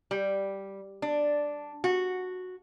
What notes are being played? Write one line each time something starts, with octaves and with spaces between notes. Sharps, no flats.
G3
D4
F#4